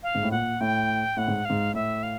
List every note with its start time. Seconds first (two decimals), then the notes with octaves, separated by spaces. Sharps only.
0.03 F5
0.15 G#2
0.23 A2
0.31 A#2 F#5
0.61 A2 G5
1.17 A2 F#5
1.28 G#2
1.45 G#2 F5
1.74 A2 E5
2.03 F5